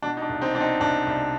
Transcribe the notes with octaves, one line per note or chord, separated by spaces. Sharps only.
B2 D4
D#4
D4
C2
C4 D#4
B2 D4
C4 D#4
C2 D4
C2